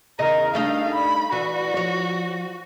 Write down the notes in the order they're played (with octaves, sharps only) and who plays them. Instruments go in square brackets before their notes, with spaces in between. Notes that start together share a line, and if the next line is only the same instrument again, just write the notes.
[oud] E2 C#3 D#5 [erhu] A#4
[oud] G3 A3 D#4 [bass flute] D4 [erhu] F5
[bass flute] D5 [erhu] B5
[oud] E3 [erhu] F#4
[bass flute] F3 [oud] C#5